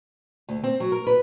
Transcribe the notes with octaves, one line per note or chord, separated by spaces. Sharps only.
D2
C4
F#3
A#4
B4